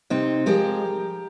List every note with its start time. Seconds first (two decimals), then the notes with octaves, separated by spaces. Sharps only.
0.10 C3 C4 D#4
0.46 F3 G#3 G4 A#4